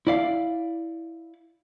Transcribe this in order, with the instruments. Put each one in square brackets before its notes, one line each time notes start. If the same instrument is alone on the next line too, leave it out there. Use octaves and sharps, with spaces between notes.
[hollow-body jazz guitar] E4 D5 F5